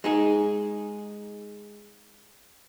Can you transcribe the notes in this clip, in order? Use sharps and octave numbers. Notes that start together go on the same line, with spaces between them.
G#3 D#4 G#4